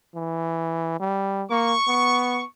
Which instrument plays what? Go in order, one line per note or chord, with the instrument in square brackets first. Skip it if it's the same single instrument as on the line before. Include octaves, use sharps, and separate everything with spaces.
[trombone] E3
G3
[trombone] A#3 [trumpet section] C#6
[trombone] B3